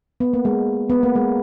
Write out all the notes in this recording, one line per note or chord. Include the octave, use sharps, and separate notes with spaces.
B3
A#3
G#3
B3
A#3
G#3